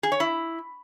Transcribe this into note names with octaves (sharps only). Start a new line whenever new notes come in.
G#4
C#5
E4